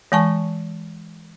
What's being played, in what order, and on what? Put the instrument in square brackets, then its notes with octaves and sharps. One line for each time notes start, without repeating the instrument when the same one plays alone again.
[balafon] E3 G#3 G#5 A5 C#6